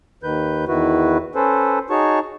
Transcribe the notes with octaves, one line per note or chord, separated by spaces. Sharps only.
D#2 D#3 B4 G6
E2 D#3 E4 F#4 B4
C#4 A4 B4 C5
D#4 F#4 G#4 C#5 A5 C#6